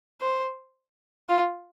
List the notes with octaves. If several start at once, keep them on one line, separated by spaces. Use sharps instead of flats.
C5
F4